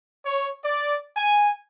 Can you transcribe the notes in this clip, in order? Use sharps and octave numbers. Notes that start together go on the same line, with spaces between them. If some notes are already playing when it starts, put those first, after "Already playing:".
C#5
D5
G#5